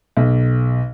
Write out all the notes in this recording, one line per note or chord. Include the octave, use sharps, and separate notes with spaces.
B1